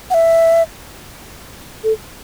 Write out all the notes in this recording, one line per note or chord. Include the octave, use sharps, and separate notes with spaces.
F#5
E5
A4